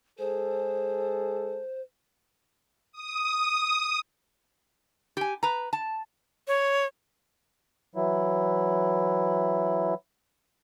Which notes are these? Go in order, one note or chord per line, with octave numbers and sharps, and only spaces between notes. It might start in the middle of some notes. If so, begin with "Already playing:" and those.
G#3 G#4 A4 C5
D#6
G4 G#5
B4 A#5
A5
C#5
E3 F#3 E4